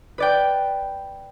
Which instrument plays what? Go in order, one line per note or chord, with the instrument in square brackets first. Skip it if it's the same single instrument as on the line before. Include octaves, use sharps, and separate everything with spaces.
[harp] B4 D5 G5